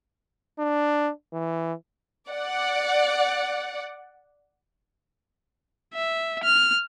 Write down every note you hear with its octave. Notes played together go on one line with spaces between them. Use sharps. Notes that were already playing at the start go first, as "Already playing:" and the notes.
D4
E3
D5 F#5
E5
F6